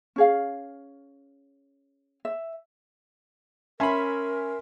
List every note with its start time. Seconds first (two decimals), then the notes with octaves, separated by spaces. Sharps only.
0.16 C#4 G#4 F5
2.25 E5
3.80 C#4 A#4 E5 G#5 B5 C6